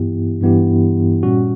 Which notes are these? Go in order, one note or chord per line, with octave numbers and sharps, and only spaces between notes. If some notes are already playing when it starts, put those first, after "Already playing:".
Already playing: G2 E3 B3 E4 G4
G2 E3 B3 E4 G4
A#2 G3 C#4 F#4